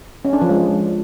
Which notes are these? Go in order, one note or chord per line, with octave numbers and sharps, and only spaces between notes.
C#4
D4
F3
G#3